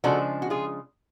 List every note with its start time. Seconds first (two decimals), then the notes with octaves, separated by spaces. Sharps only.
0.04 C#3 F3 G#3 D4 F#4 A4
0.42 F#4
0.50 F4 G#4